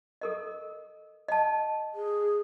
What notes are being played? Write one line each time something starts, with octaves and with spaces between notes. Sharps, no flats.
A4 A#4 D#5
D#5 A5
G#4